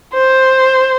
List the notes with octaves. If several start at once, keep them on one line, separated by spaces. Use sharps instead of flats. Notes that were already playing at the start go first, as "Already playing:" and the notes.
C5